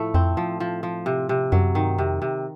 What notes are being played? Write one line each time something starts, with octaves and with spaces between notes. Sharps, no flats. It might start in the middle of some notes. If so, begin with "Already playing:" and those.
Already playing: A2 F3 A3
F2 C4
F3
F3
F3
C3
C3
F#2 F#3
G2 D#3
F2 C3
C3